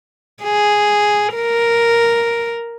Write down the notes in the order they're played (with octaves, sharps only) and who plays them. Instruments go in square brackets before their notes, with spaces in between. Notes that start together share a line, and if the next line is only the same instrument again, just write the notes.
[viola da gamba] G#4
A#4